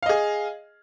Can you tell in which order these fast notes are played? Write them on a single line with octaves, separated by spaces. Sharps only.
F5 D#5 G#4